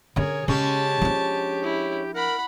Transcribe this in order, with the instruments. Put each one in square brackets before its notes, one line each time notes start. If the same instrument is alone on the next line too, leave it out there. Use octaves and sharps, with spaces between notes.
[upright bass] D3 C#4 [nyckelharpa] G#4 A#4 [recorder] C#5
[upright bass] C#3 [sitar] G#3 C#4 [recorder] G4 [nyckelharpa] A5
[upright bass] F3 D4
[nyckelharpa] E4
[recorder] A#4 [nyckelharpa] F#5 B5